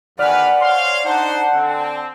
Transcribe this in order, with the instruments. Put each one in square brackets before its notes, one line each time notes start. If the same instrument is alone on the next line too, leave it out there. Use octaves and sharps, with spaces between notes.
[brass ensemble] E2 D#3 B4 [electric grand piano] D5 G#5 [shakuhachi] F#5 [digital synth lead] F6
[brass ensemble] C5 C#5 F5 [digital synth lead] C6
[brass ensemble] D4 D#4 C5 [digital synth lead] F#5 [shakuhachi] A5
[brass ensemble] D3 C4